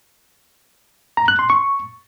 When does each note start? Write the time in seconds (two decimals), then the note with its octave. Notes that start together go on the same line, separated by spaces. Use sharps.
1.17 A#5
1.28 F#6
1.39 C6
1.50 C#6